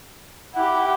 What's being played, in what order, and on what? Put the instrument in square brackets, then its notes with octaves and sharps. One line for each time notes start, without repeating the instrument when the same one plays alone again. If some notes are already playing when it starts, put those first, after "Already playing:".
[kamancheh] E4 G4 [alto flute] F#5